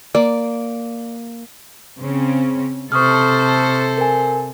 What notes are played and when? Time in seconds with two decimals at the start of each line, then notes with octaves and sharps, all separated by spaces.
0.15 A#3 D5
2.00 C#3 C4 C#4
2.92 C3 A4 C5 C#6 D#6 F6
3.98 A#4 G#5